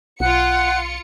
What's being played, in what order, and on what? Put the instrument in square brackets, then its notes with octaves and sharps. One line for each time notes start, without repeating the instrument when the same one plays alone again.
[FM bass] B1 [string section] F4 C#7 [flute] F#5